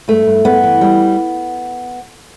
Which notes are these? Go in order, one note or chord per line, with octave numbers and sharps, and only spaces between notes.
G2 A3
G2
G2 B3
E3
G3